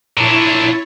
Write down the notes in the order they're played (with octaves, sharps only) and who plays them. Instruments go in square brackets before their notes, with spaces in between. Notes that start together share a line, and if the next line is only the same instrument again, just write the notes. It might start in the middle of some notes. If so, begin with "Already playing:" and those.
[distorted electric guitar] A#2 D4 [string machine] E4 C#5